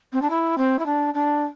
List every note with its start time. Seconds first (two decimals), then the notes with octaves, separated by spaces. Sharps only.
0.12 C4
0.22 D4
0.30 E4
0.57 C4
0.78 E4
0.86 D4
1.14 D4